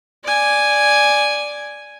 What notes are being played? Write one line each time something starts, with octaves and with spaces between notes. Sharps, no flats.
D5 G#5